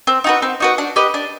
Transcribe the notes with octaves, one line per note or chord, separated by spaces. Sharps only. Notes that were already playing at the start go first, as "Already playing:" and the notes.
C4
D#4 F#4 B4
C4
D#4 F#4 B4
D4
G4 B4 D#5
D4